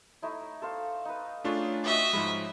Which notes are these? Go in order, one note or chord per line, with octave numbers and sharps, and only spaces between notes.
A3 D#4 E4
A4 C5 F5
D#4 B4
A3 C#4 D4 F4 G#4
F#4 D#5 E5 G5
G#2 F3 G#3 B5